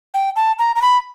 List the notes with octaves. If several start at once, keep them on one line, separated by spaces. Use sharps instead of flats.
G5
A5
A#5
A#5
B5